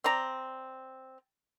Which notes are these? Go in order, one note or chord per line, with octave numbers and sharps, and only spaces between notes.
C4 D5 A#5